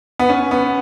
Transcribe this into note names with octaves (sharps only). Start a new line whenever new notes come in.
B3
C#4
B3